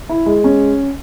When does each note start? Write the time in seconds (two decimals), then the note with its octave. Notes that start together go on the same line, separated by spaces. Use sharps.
0.09 E4
0.26 G#3
0.44 C#4